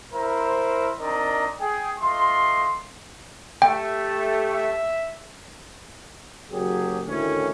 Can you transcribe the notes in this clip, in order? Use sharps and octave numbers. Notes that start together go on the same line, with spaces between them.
E4 A#4 C5
C4 D4 D#4 A#4 D5 D#5
G#4 G5
A3 F4 D#5 C6
A3 G4 G5
E5
F#1 F#3 G4 G#4
D2 A2 D#3 E3 C#4